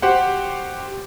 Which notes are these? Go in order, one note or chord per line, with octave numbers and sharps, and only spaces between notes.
F#4 G4 C5 F#5